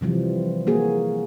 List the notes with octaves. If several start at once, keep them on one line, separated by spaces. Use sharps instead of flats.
C3 E3 F3 G3
A#3 F#4 G#4